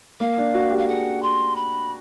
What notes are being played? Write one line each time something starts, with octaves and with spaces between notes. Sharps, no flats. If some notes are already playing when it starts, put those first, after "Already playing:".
A#3 F5
D4
F#4
G4
F5
G#4 F#5
C6
B5